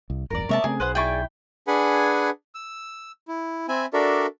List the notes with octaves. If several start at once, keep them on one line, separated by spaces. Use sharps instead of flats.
C2
D1 G1 E2 A#4 D5
C3 G#3 A#3 C#5 E5 A5
C#3 A3 C4 G#4
B1 B4 C5 F#5
E4 G#4 D5 G5 C#6
D4 G#4 B4 F#5 G#5 B5
E6
E4
C4 E5 G#5 B5
D4 F#4 A4 A#4 D5 E5